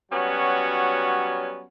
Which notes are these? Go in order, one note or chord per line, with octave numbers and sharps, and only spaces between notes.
F#3 G3 B3 C#4 F#4